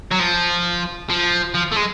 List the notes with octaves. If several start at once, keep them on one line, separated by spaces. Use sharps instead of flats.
F#3
F3
F3
F3
A3
G#3